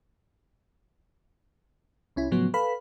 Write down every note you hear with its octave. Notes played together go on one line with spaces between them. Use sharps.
C2 C#4 E4
A2 C#3 F3 F#3 B3
A4 B4 F5 B5